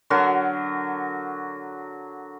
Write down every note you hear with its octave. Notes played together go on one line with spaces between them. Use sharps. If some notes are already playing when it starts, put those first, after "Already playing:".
D3 F#3 F#4 A#4